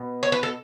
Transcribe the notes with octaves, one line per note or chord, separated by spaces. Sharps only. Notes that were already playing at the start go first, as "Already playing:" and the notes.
Already playing: B2 B3
C#5
B4
A4